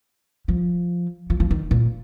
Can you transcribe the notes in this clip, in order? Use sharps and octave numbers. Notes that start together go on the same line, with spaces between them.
F3
F3
F3
D#3
A#2